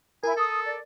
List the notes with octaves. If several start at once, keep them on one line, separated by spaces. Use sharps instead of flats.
E4 A#4 G#5
A4 D#6
D5